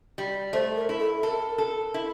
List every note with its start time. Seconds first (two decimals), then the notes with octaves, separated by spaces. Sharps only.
0.18 G3
0.53 A3 C5
0.76 A#4
0.89 E4
1.00 A4
1.23 A4 A#4
1.58 A4
1.94 E4